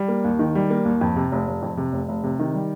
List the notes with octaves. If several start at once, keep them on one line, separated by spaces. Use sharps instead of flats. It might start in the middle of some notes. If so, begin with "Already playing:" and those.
Already playing: G3
A#3
D#2
D#3
G3
A#3
D#2
F2
C3
F1
F1
F2
C3
F1
F1
C3
D#3
G3